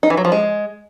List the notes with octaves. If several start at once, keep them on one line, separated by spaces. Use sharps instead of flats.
D#4
E3
F#3
F3
G#3